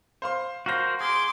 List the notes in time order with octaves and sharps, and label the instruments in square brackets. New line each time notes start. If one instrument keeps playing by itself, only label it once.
[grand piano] C5 F5 C6
[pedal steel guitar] F#4 A#4 C5 [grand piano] F5 A#6
[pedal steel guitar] G#4 [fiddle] C6 D6